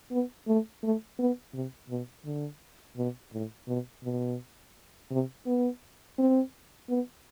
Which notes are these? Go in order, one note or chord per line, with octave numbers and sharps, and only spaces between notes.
B3
A3
A3
B3
C3
B2
D3
B2
A2
B2
B2
C3
B3
C4
B3